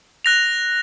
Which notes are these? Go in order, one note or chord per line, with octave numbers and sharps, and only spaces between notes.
F#6 A#6 F7